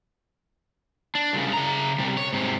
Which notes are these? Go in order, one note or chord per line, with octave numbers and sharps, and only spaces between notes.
D4
C2 C#3
C#3 A#5
C3 G3
C#5
G#2 C3